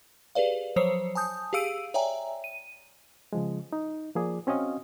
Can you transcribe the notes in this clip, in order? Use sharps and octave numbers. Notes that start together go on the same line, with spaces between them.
G4 G#4 B4 D5 F5
F3 F#3 C5 C#5 C7 C#7
G#5 A5 D#6 G6
G4 G#4 F5 E6 D7 D#7
C#5 D5 E5 G5 G#5 A#5
D#7
C#3 F3 G#3
D#4
F3 A#3 G#4 D5
C4 C#4 F#4 D#5 F5